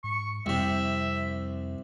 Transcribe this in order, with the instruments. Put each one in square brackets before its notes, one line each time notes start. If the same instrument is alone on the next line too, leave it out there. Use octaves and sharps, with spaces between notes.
[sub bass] G#2 [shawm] C#6
[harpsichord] C2 C3 [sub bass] F2 [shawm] E5